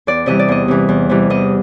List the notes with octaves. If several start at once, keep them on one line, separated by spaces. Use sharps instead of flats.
E2 D5
C3 E3 G3 D#5
D5
E2 D#5
C3 E3 G3
E2
C3 E3 G3
E2 D#5